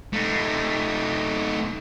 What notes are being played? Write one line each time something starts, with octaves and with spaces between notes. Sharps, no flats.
A3 D#4